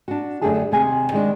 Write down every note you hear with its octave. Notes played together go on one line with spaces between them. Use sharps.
D4 F#4
F#2 D3 A3 G4 G#4 A5
D#2 C3 C4 G#4 G#5
D#3 G#3 D4